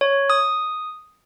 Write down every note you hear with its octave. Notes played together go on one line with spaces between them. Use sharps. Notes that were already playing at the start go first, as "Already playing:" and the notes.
C#5
D#6